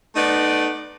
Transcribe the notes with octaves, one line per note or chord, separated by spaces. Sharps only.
A3 B3 D#4 D5